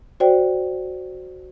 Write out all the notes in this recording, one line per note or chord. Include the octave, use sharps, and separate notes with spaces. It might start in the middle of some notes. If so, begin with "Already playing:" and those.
F#4 C5 D5 G5